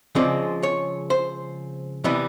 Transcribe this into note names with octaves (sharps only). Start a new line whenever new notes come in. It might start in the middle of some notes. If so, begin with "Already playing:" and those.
C#3 F3 G#3 C4 D5
C#5
C5
C3 E3 G3 B3